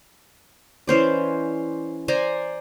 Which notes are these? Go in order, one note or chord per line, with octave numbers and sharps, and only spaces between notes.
E3 C#4 C5 D5
C5 D5 G#5 A#5